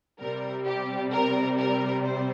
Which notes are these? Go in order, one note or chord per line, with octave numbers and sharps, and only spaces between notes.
C3 G3 C4 A#4
G4
A#4
A#4
C5